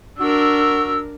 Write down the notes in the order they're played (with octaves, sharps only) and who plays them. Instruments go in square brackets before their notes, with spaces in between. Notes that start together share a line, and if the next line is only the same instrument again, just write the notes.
[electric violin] D4 A#4 [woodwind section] F#4 E6